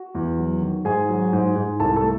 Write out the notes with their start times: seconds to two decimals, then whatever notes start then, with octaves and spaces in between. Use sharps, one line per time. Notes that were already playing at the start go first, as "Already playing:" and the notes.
Already playing: F#4
0.15 E2
0.38 F#3
0.62 D#3
0.85 G#2 G#4 G#5
1.09 F#3
1.33 G#2
1.56 G#2
1.80 C2 A4 A5
1.96 A4 A5
2.03 A3